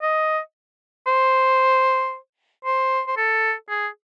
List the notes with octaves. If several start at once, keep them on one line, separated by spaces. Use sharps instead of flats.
D#5
C5
C5
C5
A4
G#4